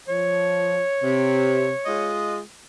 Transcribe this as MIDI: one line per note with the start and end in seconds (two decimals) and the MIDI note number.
0.08 0.79 53
0.08 2.16 73
1.02 1.69 48
1.86 2.38 56
1.86 2.38 65
1.86 2.38 75